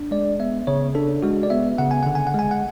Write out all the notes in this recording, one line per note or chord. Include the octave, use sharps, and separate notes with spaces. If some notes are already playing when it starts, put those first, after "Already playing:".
Already playing: D4
G#3 D5
B3 E5
C#3 C#5
D4 A4
G#3 F#4
D5
B3 E5
C#3 F#5
G#5
D3 F#5
G#5
F#5
G#3 G#5
F#5